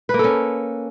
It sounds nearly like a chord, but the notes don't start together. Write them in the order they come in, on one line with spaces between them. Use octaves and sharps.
B4 A#3 A4 C#4